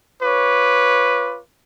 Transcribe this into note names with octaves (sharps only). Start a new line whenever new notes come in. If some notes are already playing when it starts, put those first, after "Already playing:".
F4 B4 C#5 D6